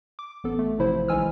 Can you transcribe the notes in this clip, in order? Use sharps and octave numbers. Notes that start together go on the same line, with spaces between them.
D6
A1 B3 A4
A3
A1 C3 F3 E4 C5
B1 E3 G#3 G#5 E6 F6